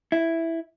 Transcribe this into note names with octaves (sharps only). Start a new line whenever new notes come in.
E4